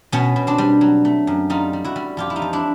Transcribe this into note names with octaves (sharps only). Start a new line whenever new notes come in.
B2 B3 C#4
B2
C4 D4
G3
F#3
A3
F#2
G3 D#4 F4
G3
E4 F#4
G3
F2 F4 G4
E4
D#4 F4
F3
D4 E4